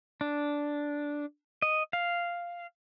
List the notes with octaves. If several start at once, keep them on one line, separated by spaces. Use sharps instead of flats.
D4
D#5
F5